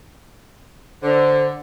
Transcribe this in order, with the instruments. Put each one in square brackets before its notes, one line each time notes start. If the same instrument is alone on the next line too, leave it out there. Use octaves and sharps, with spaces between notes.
[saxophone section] D3 [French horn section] C5